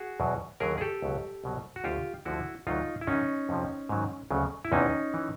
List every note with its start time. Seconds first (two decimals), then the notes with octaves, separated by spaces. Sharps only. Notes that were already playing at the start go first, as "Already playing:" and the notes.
Already playing: F#4 G#4
0.20 E2 B2 F#3
0.60 D#2 D3 F#3 G#4 A#4
0.78 G#4
0.81 G4 A4
1.02 C#2 B2 F#3
1.44 C2 B2 F#3
1.76 F#4
1.84 D2 D3 F#3 F4 G4
2.25 D2 D3 F3 E4 F#4
2.67 D2 C3 D#3 F#3 D#4 F4
3.01 E4
3.07 F#2 D#3 F#3 C#4 D#4
3.49 F2 C3 F3
3.89 G#2 D#3 F#3
4.31 D2 C#3 F#3
4.65 E4
4.72 E2 C3 E3 C#4 D#4
5.14 E3